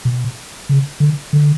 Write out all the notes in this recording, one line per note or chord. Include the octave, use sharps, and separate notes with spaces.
B2
C#3
D3
D3